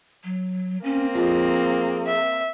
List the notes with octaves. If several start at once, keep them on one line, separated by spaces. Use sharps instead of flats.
F#3
A#3 C4 C#4
F2 F3 G#4
E5